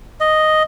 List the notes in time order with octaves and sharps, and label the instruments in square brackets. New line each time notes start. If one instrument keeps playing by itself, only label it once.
[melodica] D#5